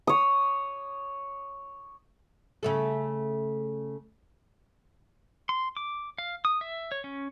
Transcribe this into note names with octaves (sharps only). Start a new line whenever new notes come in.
C#5 D#6
C#3 A3 A4
C6
D6
F5
D#6
E5
C#5
C#4